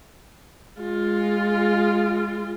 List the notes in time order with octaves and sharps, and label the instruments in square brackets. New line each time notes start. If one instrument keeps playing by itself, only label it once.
[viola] G#3 F4